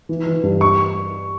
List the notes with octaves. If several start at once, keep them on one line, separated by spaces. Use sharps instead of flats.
E3
E3
G2
C#6